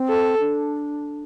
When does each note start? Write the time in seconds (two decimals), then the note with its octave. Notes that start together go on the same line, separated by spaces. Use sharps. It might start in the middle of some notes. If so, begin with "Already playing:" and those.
Already playing: C4
0.08 A4
0.40 D4